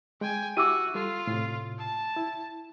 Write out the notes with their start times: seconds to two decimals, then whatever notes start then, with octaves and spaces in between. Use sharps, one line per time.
0.21 G#3 G5 G#5
0.57 E4 F#4 G4 E5 D6 E6 D#7
0.95 G3 F4 A4
1.27 A2 C3
1.79 A5
2.16 E4